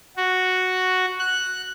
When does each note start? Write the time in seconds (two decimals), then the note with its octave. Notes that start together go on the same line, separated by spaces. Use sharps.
0.17 F#4
1.20 F#6